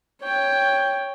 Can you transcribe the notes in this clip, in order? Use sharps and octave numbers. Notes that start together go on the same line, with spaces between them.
C#5 G5